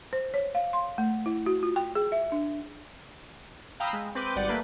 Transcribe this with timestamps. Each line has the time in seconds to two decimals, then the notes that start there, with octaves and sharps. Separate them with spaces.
0.13 C5
0.34 C#5
0.55 F5
0.73 C6
0.98 A3
1.26 E4
1.46 F#4
1.63 F4
1.76 G5
1.95 G#4
2.12 E5
2.32 D4
3.80 F5 G5 A#5 B5 D#6 E6
3.93 G#3
4.15 C4 B4 D6 G6 D#7
4.36 G#1 G3 D5 F#5 G6 A6
4.49 A3 A#3 B4